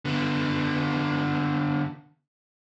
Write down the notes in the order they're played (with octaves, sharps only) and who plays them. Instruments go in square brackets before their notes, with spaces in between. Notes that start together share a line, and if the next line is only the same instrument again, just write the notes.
[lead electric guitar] D3 B3